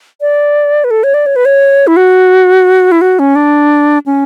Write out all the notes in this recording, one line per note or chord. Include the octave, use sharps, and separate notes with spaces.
D5
B4
A4
C#5
D5
C#5
B4
C#5
E4
F#4
E4
F#4
C#4
D4
C#4